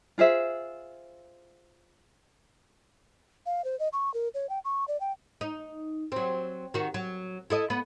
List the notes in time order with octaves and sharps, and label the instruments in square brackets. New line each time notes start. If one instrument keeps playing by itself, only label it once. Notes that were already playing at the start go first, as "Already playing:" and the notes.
[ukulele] F4 G#4 C5 E5
[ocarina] F5
C5
D#5
C#6
A#4
C#5
G5
C#6
D5
G5
[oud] D#4
F#3 C4
D#3 F#4
F#3
E4 A4 D#5
B3